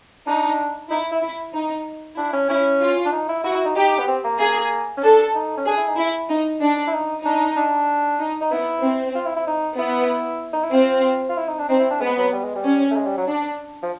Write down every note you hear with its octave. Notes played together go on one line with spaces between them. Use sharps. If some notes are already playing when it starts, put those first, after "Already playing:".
D4 D#4
D#4 E4
E4
E4
D#4
D4 E4
C#4
C#4 E4
F4
D4
D#4
E4
E4 F#4
E4
D#4
D#4 G4
B3
C4
A#3
A#3 G#4
C#4
D4 A4
D#4
C#4
D4 G#4
E4
D#4
E4
D#4
D4
E4
D#4
D4 D#4
D4
D#4
D#4
B3 E4
C4
F4
E4
E4
D#4
B3 E4
D#4
E4
C4 F4
F4
E4
D#4
D4
C4 D#4
E4
D4
G#3 B3
F#3
G3
G#3
G3
C#4
A3
G#3
G3
F#3
D4
F3